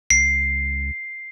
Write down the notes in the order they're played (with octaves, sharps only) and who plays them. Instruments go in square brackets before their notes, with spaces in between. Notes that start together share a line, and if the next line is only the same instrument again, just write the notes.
[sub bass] C#2 [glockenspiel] C7